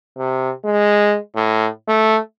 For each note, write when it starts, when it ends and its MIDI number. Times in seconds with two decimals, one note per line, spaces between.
0.18 0.51 48
0.65 1.17 56
1.35 1.68 45
1.88 2.19 57